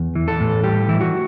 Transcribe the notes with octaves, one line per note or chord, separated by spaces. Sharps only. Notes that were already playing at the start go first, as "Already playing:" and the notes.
Already playing: E2
E3
A4
A2
G3 G4
E3 E4
F#4